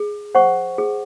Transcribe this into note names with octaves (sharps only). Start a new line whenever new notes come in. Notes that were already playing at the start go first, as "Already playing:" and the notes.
Already playing: G#4
C5 F#5 C#6
G#4